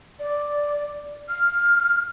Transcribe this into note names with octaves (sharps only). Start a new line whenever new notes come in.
D5
F6